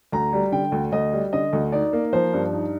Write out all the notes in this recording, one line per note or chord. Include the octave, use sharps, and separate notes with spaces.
D2 A#5
G3
D3 G5
D2
D2 D#5
G3
D3 D#5
D2
D#4 D5
A#3
F3 C5
G2
D#4